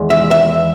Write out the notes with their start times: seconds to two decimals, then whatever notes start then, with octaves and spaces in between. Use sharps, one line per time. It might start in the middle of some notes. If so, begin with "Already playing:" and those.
Already playing: E2 D#3 G#3
0.10 E5
0.31 E5